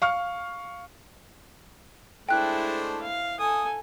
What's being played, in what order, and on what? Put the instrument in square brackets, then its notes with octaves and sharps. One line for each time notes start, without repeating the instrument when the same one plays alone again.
[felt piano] F5 C#6 F6
[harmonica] G#3 A3 D4 [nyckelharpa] E4 C5 [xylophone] G5 F#6
[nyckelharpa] F5
[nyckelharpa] A4 G#5 [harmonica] D#6